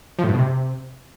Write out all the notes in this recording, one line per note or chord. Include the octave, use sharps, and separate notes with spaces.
F3
A2
G2
B2
C3